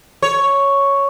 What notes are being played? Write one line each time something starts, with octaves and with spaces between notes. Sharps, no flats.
C#5